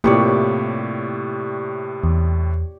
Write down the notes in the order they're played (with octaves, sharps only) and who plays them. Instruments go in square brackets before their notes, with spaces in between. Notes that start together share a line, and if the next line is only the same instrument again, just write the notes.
[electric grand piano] A2 C3 [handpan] A#3 E4 F4 [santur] G4 C#5 D5
[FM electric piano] E2